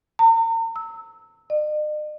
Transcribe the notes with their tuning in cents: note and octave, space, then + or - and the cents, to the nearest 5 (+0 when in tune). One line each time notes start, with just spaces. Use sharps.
A#5 -40
E6 -15
D#5 -45